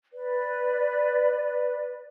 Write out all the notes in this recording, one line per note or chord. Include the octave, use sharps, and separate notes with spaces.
B4 D5